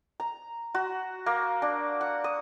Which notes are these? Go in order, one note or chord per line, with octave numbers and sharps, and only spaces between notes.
A#5
F#4
A#3
D4
F#5
D#6